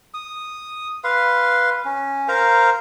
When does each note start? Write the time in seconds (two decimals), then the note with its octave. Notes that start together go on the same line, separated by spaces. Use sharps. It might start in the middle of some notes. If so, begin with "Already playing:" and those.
0.14 D#6
1.04 B4 F5 C6
1.85 C#4
2.28 A#4 C5 F5 A#5